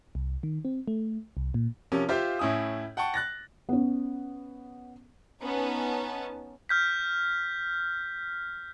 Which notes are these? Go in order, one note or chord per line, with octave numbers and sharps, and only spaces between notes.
C2
D#3
C4
A3
C2
A#2
C3 F3 C#4 A#4
F4 G4 C5 E5 F5
A2 C#4 E4 G#5 D#6
F#5 G5 A5 C#6
F#6 A6 A#6
B3 C#4
B3 C#4 D#4 A5
F6 G6 B6